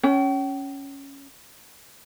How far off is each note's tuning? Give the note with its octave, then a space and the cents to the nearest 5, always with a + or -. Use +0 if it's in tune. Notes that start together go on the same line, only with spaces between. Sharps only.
C#4 +0 G5 -40